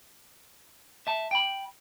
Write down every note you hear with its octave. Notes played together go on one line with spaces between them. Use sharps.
E5 A5
G5 B5